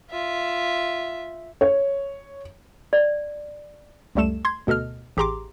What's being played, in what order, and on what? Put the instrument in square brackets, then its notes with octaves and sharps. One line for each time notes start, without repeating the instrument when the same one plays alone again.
[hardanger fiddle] F4 E5
[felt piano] C#5
[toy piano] D5
[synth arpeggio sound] C#2 F#2 G3 A3 A4 E7
C6 G#6
D2 B2 A4 D#5 F6
A1 G4 G#4 A#5 C6 D6